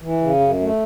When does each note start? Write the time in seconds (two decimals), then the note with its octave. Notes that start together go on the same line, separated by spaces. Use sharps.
0.01 E3
0.21 C#3
0.40 F#2
0.60 A3